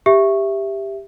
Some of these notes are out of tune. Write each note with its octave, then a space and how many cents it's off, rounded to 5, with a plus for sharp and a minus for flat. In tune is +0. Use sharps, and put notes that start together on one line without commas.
G4 +10 E5 +5